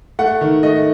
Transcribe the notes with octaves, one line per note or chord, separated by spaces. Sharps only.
A3 F#5
D#3
A3 D#5